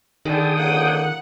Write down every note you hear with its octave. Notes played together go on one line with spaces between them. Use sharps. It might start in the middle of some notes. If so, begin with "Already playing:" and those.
D3 D#3 G#4 G5 D#6
C#2 D3 A#3 F#5